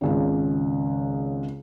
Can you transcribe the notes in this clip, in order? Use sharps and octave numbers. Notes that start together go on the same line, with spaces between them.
G#1 C#2 C#3